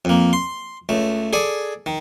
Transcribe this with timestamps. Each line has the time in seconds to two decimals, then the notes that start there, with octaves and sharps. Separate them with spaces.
0.05 F2 A#3
0.33 C6
0.89 C#2 A3
1.33 G#4 A4 D5 G#5
1.86 D#3